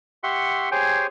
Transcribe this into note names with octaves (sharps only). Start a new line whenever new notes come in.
G4 E5 F#5 C6 C#6
G4 G#4 C5 C#5 G5 G#5